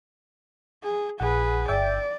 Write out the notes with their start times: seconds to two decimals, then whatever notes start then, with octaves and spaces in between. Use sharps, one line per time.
0.83 G#4
1.20 A#1 G#4 B4 F#5
1.68 G1 D5 E5 G5